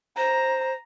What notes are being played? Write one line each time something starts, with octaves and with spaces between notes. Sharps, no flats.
C5 A#5